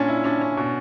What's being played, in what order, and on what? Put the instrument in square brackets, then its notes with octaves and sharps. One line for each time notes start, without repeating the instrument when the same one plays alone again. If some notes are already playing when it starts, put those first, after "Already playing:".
Already playing: [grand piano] A#2 C#4 [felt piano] D4
[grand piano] E4
[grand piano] C#4 [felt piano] D4
[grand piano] C#4
B2